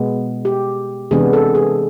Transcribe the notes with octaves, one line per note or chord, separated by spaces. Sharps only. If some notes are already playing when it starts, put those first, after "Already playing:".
Already playing: B2 G#3 B3
G4
C3 E3 G#3 B3 D4 G#4
A4
G#4